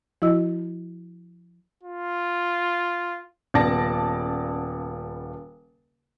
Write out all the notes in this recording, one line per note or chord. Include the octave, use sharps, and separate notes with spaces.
F3 E4 F#4 D#5 E6
F4
D#1 C#3 B3 D5 A5 A#6